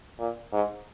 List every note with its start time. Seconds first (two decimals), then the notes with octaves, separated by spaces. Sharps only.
0.19 A#2
0.53 G#2